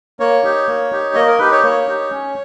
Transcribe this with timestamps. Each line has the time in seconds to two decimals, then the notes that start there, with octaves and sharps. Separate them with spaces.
0.20 A#3 C#5
0.43 D#4 G4
0.67 A#3
0.91 D#4 G4
1.15 A#3 D#5
1.27 A#4
1.39 D#4 G4 B4
1.52 C#5
1.63 A#3 C#5
1.87 D#4 G4
2.11 C#4